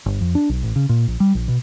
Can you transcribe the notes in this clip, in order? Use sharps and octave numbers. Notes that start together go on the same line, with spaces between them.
G1
F2
D4
B1
A1
C#3
A#2
A#1
G3
A#1
B2